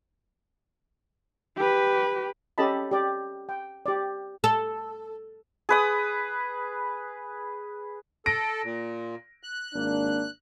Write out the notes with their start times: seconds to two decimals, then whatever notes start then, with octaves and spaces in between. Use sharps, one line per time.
1.57 G4 B4
2.58 C#4 G4 A4 D#5 A5 B5
2.91 G4 D5
3.49 G5
3.86 G4 D5
4.44 A4
5.69 G#4 B4 D#6
8.26 A4 A#6 D7
8.64 A#2
9.43 F#6
9.74 G#1 A#3 D4